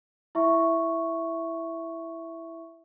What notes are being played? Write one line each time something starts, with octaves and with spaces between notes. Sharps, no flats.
E4 E5 C#6